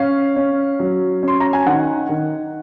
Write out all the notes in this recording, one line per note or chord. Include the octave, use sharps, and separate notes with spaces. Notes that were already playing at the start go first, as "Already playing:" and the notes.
Already playing: C#4 F5
C#4
F#3
C#4 C6
A#5
G#5
D#3 F#5
D#3